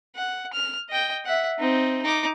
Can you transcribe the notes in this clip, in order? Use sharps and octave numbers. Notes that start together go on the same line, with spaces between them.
F#5
F6
D#5 G5
E5 F#5
C4 D#4
D#4 D6